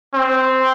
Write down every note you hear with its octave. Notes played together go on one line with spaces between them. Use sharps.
C4